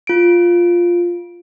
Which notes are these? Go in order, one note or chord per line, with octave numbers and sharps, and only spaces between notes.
F4 D7